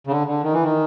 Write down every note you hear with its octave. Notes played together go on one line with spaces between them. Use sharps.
C#3
D3
D3
D#3
E3
D#3